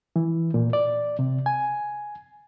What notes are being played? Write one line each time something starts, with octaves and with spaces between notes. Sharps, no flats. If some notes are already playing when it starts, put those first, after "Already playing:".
E3
A#2
D5
C3
G#5